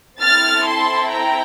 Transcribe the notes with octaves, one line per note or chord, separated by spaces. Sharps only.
C4 E4 A4 F6 A6
A5 C6
G5 A#5